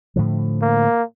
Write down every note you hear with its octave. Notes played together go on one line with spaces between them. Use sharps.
A2 D3 F3
A#3